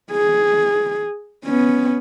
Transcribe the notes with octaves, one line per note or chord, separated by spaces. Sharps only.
G#4
B3 C#4